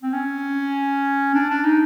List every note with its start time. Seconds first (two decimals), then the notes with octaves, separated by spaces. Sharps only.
0.03 C4
0.13 C#4
1.34 D4
1.50 D4
1.64 D#4